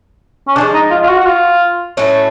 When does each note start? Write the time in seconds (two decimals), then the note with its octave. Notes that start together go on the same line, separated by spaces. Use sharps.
0.48 C#4
0.56 D3 F3 G#3 D4
0.74 D#4
0.91 F4
1.03 F4
1.09 F#4
1.19 F#4
1.26 F4
1.97 A2 F#3 A3 C#4